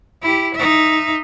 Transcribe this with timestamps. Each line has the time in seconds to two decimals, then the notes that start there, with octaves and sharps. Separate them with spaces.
0.22 E4 G4
0.55 D#4 E5